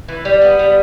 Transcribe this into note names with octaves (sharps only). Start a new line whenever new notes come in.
E3
G3
B3
G3